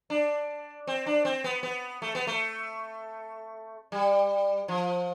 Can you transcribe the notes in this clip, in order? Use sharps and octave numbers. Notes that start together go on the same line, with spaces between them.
D4
C4
D4
C4
B3
B3
A3
B3
A3
G3
F3